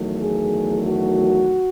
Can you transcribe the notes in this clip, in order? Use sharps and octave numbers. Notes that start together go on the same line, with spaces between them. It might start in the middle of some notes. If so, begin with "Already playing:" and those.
Already playing: E2 D#3 F#3 A3
G#4
F#4